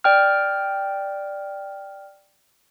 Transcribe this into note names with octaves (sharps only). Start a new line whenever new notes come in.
D5 G5 F6